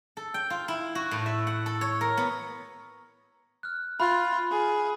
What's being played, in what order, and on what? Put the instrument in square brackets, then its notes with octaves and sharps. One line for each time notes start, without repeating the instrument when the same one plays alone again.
[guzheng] A4
G5
F4
E4
F#4
A2
E5
F#5
A4
C#5
A#4
B3
[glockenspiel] F6 F#6
[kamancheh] F4 [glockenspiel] B5 F#6
[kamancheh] G#4